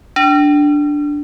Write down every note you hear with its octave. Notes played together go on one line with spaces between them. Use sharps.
D4